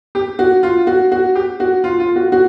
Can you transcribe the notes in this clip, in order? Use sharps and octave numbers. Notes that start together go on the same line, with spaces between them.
G4
F#4
F4
F#4
F#4
G4
F#4
F4
F4
F#4
F#4